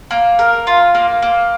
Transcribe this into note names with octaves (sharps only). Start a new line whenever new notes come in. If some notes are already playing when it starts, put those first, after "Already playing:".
A#3
A#4
F4
A#3
A#3